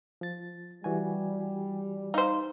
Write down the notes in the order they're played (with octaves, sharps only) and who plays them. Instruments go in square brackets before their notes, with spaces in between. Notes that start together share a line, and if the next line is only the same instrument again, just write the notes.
[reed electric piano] F3 A6
[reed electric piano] E3 F#4 G#5 [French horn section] G3
[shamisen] D#4 C5 [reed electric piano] F5